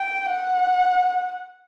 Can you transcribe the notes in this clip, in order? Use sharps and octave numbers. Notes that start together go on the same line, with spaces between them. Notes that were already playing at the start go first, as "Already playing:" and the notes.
Already playing: G5
F#5